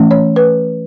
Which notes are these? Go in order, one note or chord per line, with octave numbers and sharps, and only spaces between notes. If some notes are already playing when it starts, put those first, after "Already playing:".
Already playing: E3 A3 C#4
C#5
B4